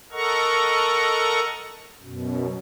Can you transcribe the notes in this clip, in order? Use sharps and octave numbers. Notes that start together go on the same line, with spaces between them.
A4 A#4 D#5 F#5 A#5 C#6
F#2 B2